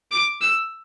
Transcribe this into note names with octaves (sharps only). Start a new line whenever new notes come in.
D6
E6